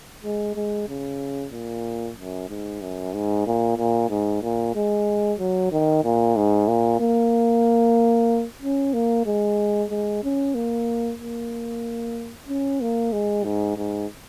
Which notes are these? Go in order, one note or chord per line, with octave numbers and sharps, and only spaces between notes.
G#3
G#3
C#3
A#2
F#2
G#2
F#2
G#2
A#2
A#2
G#2
A#2
G#3
F#3
D#3
A#2
G#2
A#2
A#3
C#4
A#3
G#3
G#3
C#4
A#3
A#3
C#4
A#3
G#3
G#2
G#2